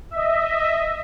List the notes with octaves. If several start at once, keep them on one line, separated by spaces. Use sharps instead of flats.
D#5 E5